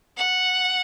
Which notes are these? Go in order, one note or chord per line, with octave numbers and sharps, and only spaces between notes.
F#5